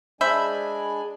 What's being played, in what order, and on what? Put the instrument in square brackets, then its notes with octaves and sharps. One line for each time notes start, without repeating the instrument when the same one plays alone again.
[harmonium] G#3 D4 G#5 [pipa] C5 E5 [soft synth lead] B5